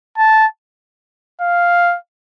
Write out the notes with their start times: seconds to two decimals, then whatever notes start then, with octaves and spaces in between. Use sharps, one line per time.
0.18 A5
1.41 F5